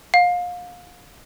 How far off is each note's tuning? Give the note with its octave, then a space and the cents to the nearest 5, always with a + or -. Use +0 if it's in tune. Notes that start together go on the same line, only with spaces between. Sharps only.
F5 +30